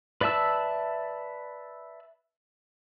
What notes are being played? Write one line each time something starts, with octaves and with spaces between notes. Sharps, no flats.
B4 D5 E5 A5 E6